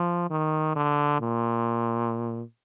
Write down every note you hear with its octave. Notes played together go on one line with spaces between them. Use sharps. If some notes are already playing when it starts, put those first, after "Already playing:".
Already playing: F3
D#3
D3
A#2